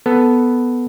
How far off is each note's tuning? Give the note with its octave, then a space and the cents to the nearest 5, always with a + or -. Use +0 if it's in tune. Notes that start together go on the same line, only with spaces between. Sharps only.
B3 +0 A4 +0